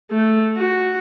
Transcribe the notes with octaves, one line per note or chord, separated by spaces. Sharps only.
A3
F#4